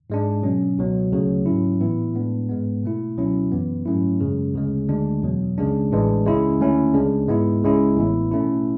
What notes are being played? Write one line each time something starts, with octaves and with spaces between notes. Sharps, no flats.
G#2 G#3 D4
B2 F#3 C#4
C#2 B2 F#3
D2 C#3 F#3 A3
G#2 F#3 C#4 E4
A2 E3 B3 E4
A2 G#3 B3 D4
G#2 G#3 B3
B2 A3 E4
C#2 B2 F#3 C#4 E4
F#2 E3 B3
G#2 F#3 A3 C#4 E4
F#2 C#3 G#3
D2 C#3 G#3
D2 D3 G#3 D4
E2 B2 F#3
C#2 C#3 G#3 D4
A1 A2 E3 G#3 D4
C#2 C#3 G#3 C#4 E4
D2 D3 A3 C#4 E4
C#2 C#3 G#3 D4
G#2 G#3 B3 E4
C#2 C#3 G#3 C#4 E4
A1 A2 E3 B3 E4
B2 A3 C#4 E4